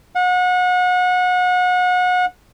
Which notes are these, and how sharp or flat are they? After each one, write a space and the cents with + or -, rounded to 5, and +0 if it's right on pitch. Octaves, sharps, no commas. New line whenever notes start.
F#5 -30